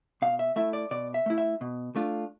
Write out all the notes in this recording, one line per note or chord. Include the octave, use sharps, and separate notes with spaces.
B2 F5
E5
A3 E4 E5
D5
B2 D5
E5
A3 E4
E5
B2
A3 D4 F4